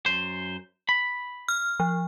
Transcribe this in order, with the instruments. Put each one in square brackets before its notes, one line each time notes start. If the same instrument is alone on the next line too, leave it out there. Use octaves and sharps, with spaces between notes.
[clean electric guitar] F#2 C5
B5
[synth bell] F6
F3